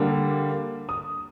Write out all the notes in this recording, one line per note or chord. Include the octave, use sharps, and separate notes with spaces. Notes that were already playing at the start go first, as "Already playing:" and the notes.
Already playing: D3 G3 A#3
D#6